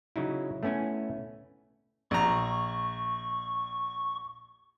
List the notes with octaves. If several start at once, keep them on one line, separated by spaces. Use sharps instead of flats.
C#3 F#3 D#4 E4
A3 B3 C#4 E4 G#5
A#1 A#5 C#6